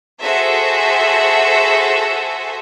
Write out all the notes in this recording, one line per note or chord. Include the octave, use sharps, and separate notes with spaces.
F#4 G#4 A4 C5 E5